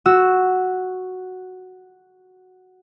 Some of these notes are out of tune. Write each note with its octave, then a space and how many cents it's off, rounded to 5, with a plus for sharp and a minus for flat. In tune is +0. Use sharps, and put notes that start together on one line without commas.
F#4 +0 E6 -5